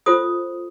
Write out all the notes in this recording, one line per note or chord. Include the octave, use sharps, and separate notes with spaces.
F4 A4 C5 D#6